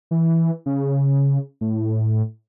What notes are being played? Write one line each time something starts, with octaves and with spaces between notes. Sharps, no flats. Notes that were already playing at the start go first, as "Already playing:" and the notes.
E3
C#3
A2